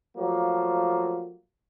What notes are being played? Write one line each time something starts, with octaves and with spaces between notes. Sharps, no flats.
F3 F#3 A3 A#3